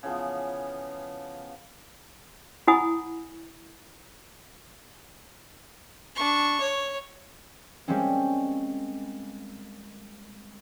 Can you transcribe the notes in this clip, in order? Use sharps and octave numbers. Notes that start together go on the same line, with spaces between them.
C#3 E3 F3 B3
E4 F#5 G#5 B5 D#6
D4 C#6
C#5
G3 G#3 A#3 C4 C#4